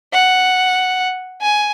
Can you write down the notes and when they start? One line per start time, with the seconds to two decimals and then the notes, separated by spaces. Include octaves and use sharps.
0.13 F#5
1.42 G#5